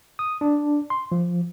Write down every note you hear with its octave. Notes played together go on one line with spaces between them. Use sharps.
D#6
D4
C6
F3